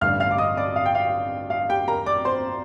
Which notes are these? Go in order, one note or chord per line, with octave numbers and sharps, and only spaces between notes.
A1 G2 D3 G3 F5 F6
F5 F6
D6
D#5 D#6
D5 D6
F5
G5
F5
F5
G4 G5
A#4 A#5
D5 D6
C5 C6